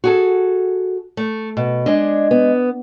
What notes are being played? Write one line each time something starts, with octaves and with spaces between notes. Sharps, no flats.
F#4 G#4 A4
A3
B2
G#3 D4 D#5
B3